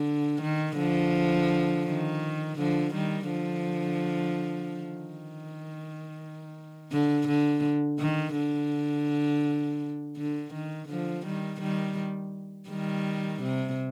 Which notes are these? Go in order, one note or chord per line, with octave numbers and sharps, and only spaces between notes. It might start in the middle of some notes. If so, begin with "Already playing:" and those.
Already playing: D3
D#3
D3 F3
D#3
D3 F3
D#3 G3
D3 F3
D#3
D3
D3
D#3
D3
D3
D#3
D3 F3
D#3 G3
D#3 G3
D#3 G3
C3